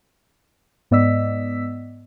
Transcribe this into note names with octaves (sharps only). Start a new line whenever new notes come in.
G#2 B3 D5 D#5 E6 B6